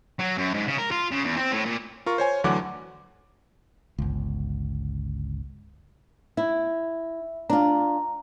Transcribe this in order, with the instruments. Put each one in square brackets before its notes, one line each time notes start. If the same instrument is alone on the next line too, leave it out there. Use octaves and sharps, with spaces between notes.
[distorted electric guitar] F#3
F#2
G#2
C#3
A#4
F4
C#3
E2
C4
A2
A#2
[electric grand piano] F4 A#4 C#6
C5 C#5 G#5
D2 D3 E3 F#3 F#5 D6
[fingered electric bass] G1 C#2
[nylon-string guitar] E4 [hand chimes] E5
[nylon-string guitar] D4 F4 [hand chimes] A#5